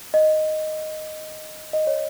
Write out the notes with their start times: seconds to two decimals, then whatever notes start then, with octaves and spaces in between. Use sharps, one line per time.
0.14 D#5
1.73 D#5
1.87 C#5